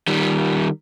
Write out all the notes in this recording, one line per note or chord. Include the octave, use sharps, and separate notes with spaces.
D#3 G3